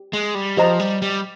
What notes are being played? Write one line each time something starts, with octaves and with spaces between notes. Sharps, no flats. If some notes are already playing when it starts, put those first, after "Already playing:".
Already playing: G4
G#3
G3
F3 G4 C5 D#5 A#5
G3
G3